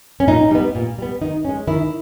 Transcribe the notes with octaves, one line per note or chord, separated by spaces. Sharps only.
C#4
A#2 D#4
G3 B3
A#2
G3 B3
D#3 D#4
G#3 C#4
D#3 E4